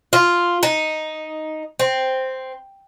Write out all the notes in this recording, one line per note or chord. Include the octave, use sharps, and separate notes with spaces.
F4
D#4
C4